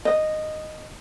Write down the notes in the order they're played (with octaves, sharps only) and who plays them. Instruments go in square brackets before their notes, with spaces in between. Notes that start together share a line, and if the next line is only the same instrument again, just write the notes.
[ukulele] D#5